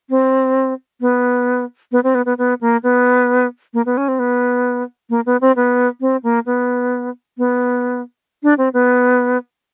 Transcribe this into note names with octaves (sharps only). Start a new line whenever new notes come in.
C4
B3
B3
C4
B3
B3
B3
A#3
B3
A#3
B3
C#4
C4
B3
A#3
B3
C4
B3
C4
A#3
B3
B3
D4
C4
B3